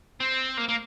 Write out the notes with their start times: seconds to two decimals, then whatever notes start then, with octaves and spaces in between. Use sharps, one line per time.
0.20 C4
0.57 A#3
0.69 A#3